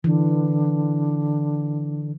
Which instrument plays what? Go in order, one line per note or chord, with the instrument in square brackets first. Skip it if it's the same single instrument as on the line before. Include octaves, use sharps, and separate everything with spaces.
[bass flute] D3 [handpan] E3